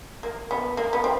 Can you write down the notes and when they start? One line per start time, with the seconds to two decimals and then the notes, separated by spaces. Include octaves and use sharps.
0.23 A#3
0.51 B3
0.77 A#3
0.93 B3
1.04 C4